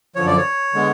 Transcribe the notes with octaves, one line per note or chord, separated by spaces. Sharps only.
F#2 D3 F3 C#5
D5
C#5
D3 G#3 B3